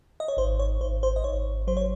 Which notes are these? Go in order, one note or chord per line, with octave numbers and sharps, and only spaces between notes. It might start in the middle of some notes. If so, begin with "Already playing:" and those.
D#5
C#5
G#1 C5
C#5
G#1 C5
C5
D#5
G#1 C#5
F#3 C5
C#5